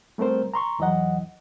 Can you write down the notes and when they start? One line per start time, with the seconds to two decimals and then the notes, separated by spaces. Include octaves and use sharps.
0.18 G3 A3 C4 A#4 C5
0.54 A#5 C6 C#6
0.79 E2 E3 F#3 D#5 F#5